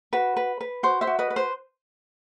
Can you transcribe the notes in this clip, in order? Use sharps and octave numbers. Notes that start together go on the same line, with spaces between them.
F#4 B4
B4
B4
F#4 C5
C5 E5
F#4
B4 D#5
B4
C5